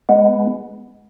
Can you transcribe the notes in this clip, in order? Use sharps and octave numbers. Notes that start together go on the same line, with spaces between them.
G#3 B3